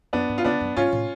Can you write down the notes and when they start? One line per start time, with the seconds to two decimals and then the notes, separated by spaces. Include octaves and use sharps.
0.13 F#2 B3 D4
0.29 G#2
0.38 F4
0.44 C#3 B3 D4
0.61 F#2
0.76 G#2 C#4 F4
0.92 A2